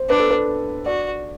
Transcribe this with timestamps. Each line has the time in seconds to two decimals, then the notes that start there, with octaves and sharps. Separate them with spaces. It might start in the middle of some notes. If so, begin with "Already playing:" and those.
Already playing: C5
0.09 D4 B4
0.20 A4
0.30 B4
0.86 F#4 D5